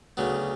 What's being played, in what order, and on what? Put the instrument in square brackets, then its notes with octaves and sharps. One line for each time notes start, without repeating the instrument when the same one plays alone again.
[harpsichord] D2 C#3 F#3 B3